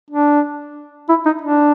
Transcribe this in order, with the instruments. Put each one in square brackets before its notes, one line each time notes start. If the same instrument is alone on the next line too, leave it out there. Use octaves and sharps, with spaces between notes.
[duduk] D4
E4
D#4
D4